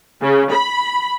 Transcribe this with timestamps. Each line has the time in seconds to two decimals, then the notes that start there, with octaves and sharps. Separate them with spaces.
0.22 C#3
0.52 B5